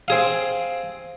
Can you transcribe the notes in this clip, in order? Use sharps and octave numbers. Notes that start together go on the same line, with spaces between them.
C4 G#4 F5